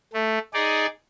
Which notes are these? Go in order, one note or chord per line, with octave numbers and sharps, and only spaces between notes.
A3
D#4 G#4 D5